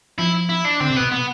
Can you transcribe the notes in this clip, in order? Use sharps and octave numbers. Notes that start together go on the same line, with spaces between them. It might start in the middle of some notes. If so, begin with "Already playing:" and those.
F3 E4
E4
D4
D3 C4
C3
B2 B3
B3